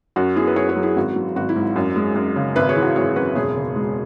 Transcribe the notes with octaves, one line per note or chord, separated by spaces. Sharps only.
F#2 F#4
B3 E4 G#4
B4
F#2 G#4 C#5
G#4 C#5
F#3
E4 G#4
G#1 F#4
F#3
G#1 F#4
E4
G#2
F#2
G#3
F#2
C#3
G#1 B4 E5
G#4 C#5
E3
F#4 B4
G#1 G#4 C#5
F#2 F#4 B4
E1 G#4 C#5
C#3
G#3